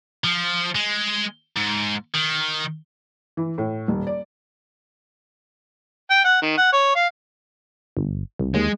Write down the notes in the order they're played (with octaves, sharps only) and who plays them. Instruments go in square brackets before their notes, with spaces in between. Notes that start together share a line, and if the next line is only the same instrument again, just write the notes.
[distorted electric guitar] F3
G#3
G#2
D#3
[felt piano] E3
A2
D#1
D5
[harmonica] G5
F#5
D#3
F#5
C#5
F5
[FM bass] G1
C2
[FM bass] D#2 [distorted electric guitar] G#3